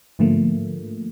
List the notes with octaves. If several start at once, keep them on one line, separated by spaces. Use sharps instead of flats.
G#2 D3 F3 A3 A#3